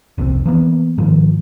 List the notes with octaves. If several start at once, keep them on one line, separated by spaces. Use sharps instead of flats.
F1 C2 A2 C4
E3 A#3 B3
G#2 D#3 F3